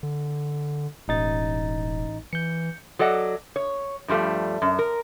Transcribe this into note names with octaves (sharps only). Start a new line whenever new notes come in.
D3
E1 A1 D#4 A6
E3 G6 C#7
F#3 A4 D5 D#5 F#5
C#5
G2 F3 G3 A3
F#2
A#4